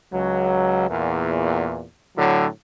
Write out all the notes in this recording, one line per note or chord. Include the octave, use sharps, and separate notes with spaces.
C#2 F#3
E2 A#2
A2 D3 F#3